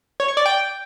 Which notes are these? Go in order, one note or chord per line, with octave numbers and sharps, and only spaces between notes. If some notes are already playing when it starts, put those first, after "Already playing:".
C#5
C#6
D5
G5